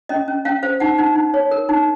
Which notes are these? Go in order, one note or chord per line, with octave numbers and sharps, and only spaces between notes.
C#4 D#5
C#4
C#4 F5
C5 F5
D#4 F#5
D#4
D#4
C#5
A#4
D#4